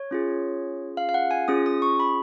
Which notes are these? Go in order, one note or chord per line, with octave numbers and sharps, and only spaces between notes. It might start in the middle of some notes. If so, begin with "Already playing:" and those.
Already playing: C#5
C#4 F4 G#4
F5
F5
F#5
G#5
C#4 F4 G#4 D#6
D#6
C#6
B5